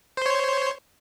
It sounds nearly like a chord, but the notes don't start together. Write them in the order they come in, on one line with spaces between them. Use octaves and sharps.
C5 C6 C#5